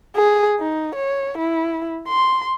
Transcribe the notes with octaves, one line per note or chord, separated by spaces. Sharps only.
G#4
D#4
C#5
E4
C6